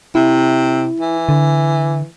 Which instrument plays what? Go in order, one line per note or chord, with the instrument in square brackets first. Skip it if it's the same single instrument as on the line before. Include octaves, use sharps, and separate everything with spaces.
[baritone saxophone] C3 [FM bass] E4
[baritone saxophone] E3
[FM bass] D3